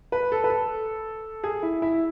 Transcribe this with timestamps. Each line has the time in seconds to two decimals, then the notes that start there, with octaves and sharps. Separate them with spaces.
0.12 B4
0.32 A4
0.44 B4
0.50 A4
1.44 G#4
1.63 E4
1.82 E4